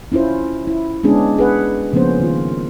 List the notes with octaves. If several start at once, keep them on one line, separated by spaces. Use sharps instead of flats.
C#4 E4 F4 C5
E4
G#3 B3 C#4 D4 G#4
G#4 B4 F#5
C#3 F3 A#3 B3 C#4 C5
D#3 F4